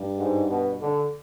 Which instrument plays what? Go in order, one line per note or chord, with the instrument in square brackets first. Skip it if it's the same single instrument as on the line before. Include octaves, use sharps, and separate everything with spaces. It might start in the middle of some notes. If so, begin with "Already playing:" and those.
Already playing: [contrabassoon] G2
[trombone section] G#2
B2
D3